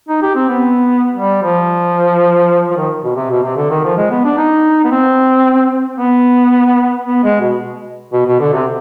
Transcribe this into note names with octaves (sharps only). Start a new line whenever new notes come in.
D#4
G4
C4
B3
G3
F3
F3
D#3
B2
C3
B2
C3
D3
D#3
F3
G#3
B3
D4
D#4
B3
C4
B3
B3
G#3
B2
B2
B2
D3
C3